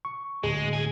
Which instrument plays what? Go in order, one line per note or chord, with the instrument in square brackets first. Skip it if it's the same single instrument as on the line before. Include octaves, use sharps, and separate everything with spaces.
[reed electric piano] C#6
[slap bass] D1 [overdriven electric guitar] G#3 [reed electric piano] G#4
[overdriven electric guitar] C3 G#5